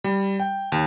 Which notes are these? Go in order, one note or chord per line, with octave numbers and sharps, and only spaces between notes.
G3
G5
D#2